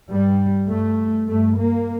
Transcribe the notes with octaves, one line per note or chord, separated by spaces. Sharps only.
G2 G3
G2 A3
G2 A3
A#3